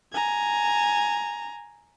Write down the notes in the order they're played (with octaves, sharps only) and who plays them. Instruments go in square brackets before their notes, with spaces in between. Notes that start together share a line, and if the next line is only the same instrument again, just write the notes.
[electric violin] G#5 A#5